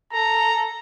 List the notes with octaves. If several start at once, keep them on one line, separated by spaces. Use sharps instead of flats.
A4 A#5